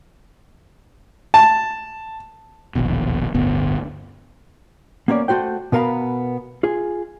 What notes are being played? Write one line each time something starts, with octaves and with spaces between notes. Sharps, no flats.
A5
E1 A#1 D#2 B2
D1 G1 D2 B3
A#3 B3 C#4 C5 D5
A3 F#4 C5 G5
B2 B3 A#4 F5 A#5 B5
F4 G#4